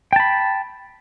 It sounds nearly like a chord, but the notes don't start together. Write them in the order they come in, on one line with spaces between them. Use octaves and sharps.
G5 A5 B5